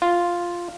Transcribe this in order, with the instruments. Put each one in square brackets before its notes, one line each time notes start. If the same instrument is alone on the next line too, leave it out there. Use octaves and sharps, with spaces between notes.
[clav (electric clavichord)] F4